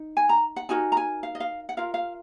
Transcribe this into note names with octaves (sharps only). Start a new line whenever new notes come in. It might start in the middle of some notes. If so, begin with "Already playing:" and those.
Already playing: D#4
G#5
A#5
F#5
D#4 F#4 A#4 G#5
A#5
G#5
F5
D#5
F5
F#5
F4 A#4 F5
F5